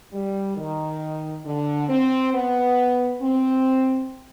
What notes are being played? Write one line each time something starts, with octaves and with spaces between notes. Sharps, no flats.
G3
D#3
D3
C4
B3
C4